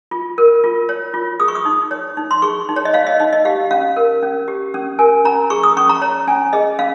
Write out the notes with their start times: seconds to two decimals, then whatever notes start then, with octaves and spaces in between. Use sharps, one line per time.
0.11 F4
0.38 A#4
0.64 F4
0.89 C#5
1.14 F4
1.40 G#4 D#6
1.48 C#6
1.55 D#6
1.65 D#4
1.91 C#5
2.17 D#4
2.31 C6
2.42 G#4 C#6
2.69 D#4
2.76 C#5
2.85 D#5
2.94 C#5 F5
3.07 D#5
3.20 D#4 D#5
3.33 D#5
3.45 G4 F5
3.71 C#4 F5
3.96 A#4
4.23 C#4
4.48 G4
4.74 C#4
4.99 A#4 G#5
5.25 C#4 A#5
5.50 G#4 C#6
5.63 D#6
5.77 C#4 C#6
5.89 A#5
6.02 C#5 A#5
6.27 C#4 G#5
6.53 G#4 D#5
6.79 C#4 F5